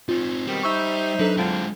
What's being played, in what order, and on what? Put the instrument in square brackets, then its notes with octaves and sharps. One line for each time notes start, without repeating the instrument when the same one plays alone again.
[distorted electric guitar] C4 D#4 [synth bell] F4
[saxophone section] B2 D#3 C4 [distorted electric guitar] G3
[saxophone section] D#4 C5 E5 [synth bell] C#6 E6 G6
[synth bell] F#3 D4 A4 [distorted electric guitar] B4
[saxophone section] D3 C4 F4 [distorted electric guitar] G#3 E4